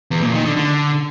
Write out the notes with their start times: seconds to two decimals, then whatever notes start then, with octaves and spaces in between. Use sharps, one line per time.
0.11 E2
0.22 A#2
0.34 D#3
0.45 D3
0.57 D3